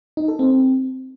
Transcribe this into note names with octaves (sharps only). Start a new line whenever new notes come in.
D#4
A4
C4